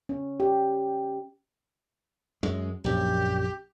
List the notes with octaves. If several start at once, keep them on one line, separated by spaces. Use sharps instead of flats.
C#4
G4
F#2 G#3
A#1 F#2 G4